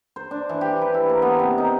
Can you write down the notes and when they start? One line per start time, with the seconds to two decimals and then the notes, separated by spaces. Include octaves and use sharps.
0.16 C5
0.31 D4
0.49 E3
0.61 G4
0.82 B4
0.94 E4
1.09 A#3
1.22 B3
1.39 C3
1.58 D#4